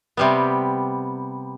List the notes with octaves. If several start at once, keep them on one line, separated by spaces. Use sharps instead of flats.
C3 G3 B3